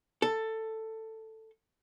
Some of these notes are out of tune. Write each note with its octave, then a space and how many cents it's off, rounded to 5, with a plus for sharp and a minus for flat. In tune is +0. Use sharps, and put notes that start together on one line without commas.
A4 +10